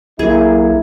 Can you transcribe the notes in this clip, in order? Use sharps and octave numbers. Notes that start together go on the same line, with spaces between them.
B1 A#3 E4 G#4